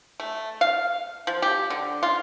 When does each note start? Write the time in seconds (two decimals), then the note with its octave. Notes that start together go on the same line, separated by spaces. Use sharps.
0.20 A3
0.61 F5
1.27 F3
1.42 G4
1.70 D3
2.03 F4